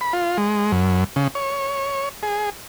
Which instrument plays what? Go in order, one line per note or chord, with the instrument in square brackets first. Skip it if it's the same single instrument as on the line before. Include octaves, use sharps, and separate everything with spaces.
[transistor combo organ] B5
F4
G#3
F#2
C#3
C#5
G#4